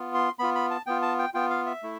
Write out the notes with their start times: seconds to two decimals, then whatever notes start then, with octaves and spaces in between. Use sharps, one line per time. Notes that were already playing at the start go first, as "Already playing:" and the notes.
Already playing: B3 F4
0.14 C6
0.39 B3 F4 B5
0.55 B5
0.71 A5
0.86 B3 F4 G5
1.02 A5
1.19 G5
1.34 B3 F4 G5
1.50 F5
1.66 E5
1.83 A3 E4